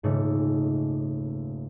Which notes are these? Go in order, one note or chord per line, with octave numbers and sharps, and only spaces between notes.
D#1 G#2 C#3 A3